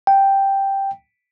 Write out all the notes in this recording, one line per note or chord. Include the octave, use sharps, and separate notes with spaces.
G5